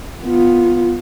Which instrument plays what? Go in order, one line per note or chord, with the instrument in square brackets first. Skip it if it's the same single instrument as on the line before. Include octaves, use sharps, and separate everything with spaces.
[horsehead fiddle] B3 F4